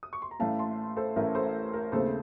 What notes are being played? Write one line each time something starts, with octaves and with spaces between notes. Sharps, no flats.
D#6
C#6
C6
A#5
A1 A2 A3 C#4 F5 A5
A5 C6
A4 C5
A1 A2 A3 C#4 A#4
A4 C5
A#4
D#2 C#3 A3 C4 A4 C5